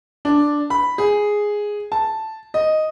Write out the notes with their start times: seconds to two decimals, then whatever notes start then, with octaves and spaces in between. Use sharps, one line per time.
0.25 D4
0.70 B5
0.98 G#4
1.92 A5
2.54 D#5